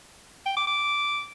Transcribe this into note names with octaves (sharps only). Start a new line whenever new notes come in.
G5
D6
D6